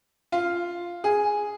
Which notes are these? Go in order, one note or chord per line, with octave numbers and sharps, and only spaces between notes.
F4
G#4